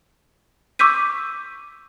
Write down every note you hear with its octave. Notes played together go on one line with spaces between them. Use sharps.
C#6 D6 E6 G6 B6 D#7